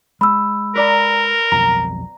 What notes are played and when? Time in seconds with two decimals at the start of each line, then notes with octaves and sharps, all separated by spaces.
0.21 G#3 B5 E6
0.76 A#4 B4 D5 A#5
1.52 B1 F2 A#5